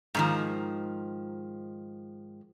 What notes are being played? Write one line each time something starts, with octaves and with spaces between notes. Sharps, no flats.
G#2 D#3 F3